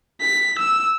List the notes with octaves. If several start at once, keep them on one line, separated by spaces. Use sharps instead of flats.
B6
E6